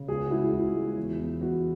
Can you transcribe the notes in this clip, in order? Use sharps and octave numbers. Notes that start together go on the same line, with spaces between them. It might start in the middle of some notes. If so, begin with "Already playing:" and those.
Already playing: C#3
C#2 G#4
F#4
G#3 E4
C#2
G#3
E2
E2
E2 F#4